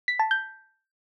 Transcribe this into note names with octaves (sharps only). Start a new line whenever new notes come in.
B6
A5
G6